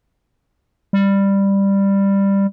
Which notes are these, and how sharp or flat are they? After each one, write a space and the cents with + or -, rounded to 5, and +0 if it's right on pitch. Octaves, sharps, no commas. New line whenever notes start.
G3 +10